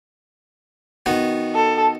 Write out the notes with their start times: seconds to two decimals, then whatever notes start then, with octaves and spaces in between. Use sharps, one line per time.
1.06 D#3 B3 F#4
1.55 A4